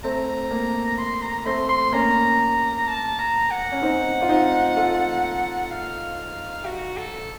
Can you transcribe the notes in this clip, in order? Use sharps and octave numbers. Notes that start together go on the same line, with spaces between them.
A3 C4 A#5
A#3
C6
A#5
A3 C4 C6
C6
A#3 C#4 A#5
A5
A#5
F#5
C#4
C4 D#4
F4
C4 D#4
F4 A4
F5
F#4
A4